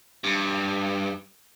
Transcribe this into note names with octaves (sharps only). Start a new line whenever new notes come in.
G2